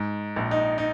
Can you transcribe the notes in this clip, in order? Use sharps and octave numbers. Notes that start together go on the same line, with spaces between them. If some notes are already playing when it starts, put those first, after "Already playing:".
Already playing: G#2
A#1
D#4
D#4